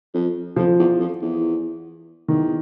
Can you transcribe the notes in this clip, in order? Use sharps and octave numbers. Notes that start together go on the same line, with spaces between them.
F2
F2 F3
E2
F2
E2
E2 D#3